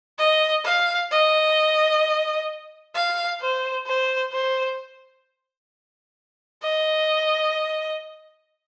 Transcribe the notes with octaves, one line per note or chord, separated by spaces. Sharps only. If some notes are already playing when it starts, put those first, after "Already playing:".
D#5
F5
D#5
F5
C5
C5
C5
D#5